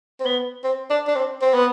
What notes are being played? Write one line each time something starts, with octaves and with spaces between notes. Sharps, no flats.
C4
B3
C4
D4
D4
C4
C4
B3